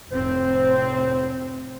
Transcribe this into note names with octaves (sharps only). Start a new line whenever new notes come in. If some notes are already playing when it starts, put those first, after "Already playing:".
F1 A2 C4 C5